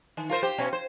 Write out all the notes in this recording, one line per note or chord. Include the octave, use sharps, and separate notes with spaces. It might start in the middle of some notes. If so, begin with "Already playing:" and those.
D#3
F4 A#4 C5
G4 C5
B2 C#4
C5